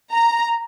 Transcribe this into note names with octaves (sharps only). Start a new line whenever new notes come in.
A#5